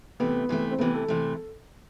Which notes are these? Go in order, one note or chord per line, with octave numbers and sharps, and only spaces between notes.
C3 E3 A3 B3
C3 E3 A3
C4
C3 E3 A3 B3
A4
C3 E3 A3